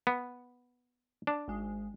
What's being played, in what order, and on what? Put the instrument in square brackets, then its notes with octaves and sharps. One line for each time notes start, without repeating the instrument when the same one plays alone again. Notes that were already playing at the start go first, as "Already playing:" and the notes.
[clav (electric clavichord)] B3
D4
[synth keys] G#1 G#3